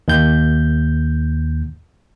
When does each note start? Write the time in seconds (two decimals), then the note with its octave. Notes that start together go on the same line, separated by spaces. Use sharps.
0.08 D#2 G6